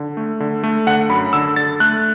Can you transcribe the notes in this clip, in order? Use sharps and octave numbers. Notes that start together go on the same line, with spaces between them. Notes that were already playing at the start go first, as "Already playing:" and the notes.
Already playing: D3
A3
D3
A3
D3 F#5
F#2 B5
D3 E6
D3 A6
A3 F#6